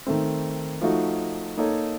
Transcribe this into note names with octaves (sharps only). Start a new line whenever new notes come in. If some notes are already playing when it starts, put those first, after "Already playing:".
D#3 A3 C4
F3 A3 D#4 F#4
A#3 D#4 A4 C#5